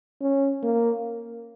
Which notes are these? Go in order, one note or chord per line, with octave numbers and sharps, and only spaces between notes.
C#4
A#3